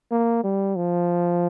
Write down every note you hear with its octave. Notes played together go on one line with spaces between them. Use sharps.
A#3
G3
F3